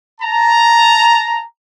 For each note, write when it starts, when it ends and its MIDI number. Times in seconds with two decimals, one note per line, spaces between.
0.21 1.43 81
0.21 1.43 82